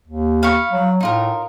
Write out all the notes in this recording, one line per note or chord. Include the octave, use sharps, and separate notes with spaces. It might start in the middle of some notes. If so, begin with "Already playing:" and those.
D#2
F5 B5 C#6
F#3
A2 D#4 F4 A#4